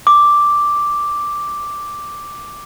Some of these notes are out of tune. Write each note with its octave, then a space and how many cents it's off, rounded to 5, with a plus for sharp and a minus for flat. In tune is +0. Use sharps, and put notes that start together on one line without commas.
D6 +0